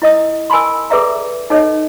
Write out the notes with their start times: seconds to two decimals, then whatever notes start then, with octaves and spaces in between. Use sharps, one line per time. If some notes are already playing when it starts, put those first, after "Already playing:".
0.02 E4 D#5 D#6
0.50 A#4 G#5 A5 B5 C6
0.90 G#4 A4 B4 D5 E5 A#5
1.50 D#4 A4 C#5 D#5